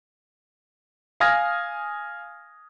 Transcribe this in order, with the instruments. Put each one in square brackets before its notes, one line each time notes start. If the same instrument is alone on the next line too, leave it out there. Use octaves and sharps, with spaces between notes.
[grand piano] F5 G#5 D#6 F6 G#6 A#6